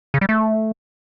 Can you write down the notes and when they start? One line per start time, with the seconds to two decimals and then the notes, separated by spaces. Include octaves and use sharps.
0.14 C#3
0.21 G3
0.29 A3